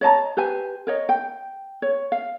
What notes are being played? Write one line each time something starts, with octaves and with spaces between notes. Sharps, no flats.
C#5 D#5 A5 A#5
G4 B4 C5 G#5
A#4 C#5 D#5
G5
C#5
F5